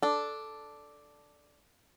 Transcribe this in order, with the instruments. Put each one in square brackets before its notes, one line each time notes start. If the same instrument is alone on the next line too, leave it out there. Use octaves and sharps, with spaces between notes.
[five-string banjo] D4 A4